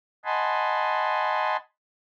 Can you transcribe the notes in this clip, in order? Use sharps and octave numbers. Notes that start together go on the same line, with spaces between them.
D#5 F#5 G#5 A5 B5 C6